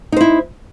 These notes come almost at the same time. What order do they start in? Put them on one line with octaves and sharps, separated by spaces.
D#4 C5 E4